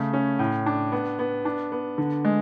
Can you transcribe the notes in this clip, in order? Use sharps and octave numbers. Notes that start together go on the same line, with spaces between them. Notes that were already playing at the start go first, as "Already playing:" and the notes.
Already playing: C#3 A3
C#4
A2
D4
B3
B3
D4
B3
D3
G#3